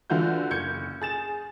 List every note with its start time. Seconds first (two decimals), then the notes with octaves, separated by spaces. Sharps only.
0.10 D3 E3 F4 F#4 G6
0.50 F#1 G6 G#6 C#7
1.01 G#4 A6 E7